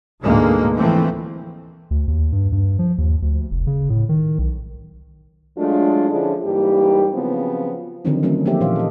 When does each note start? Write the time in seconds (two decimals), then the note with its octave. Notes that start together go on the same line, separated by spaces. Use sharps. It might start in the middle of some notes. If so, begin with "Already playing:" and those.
0.22 D2 G#2 B2 D3 G#3 A#3
0.75 E3 F3 A3 C4
1.91 D2
2.08 D#2
2.32 G2
2.52 G2
2.79 F3
2.98 D#2
3.22 D2
3.51 F1
3.67 C#3
3.90 A2
4.09 D#3
4.39 B1
5.57 F#3 G#3 A3 D4 F4
6.10 D3 F3 C#4 D4 E4 G#4
6.44 G#2 E3 G3 A#3 G4
7.14 C#3 F3 F#3 B3 C4
8.05 D3 D#3 F3 F#3 C4 D#4
8.23 D#3 E3 F#3 A3 C4 C#4
8.46 F3 A#3 D#4 G4 E5
8.60 A#2 D#3 E3 C5 E5 F5
8.76 A4 D#5